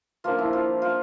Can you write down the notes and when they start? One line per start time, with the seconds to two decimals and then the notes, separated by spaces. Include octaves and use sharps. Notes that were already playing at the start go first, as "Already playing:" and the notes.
0.24 F3 A#3 D4 F4
0.39 E4
0.53 F4
0.82 F4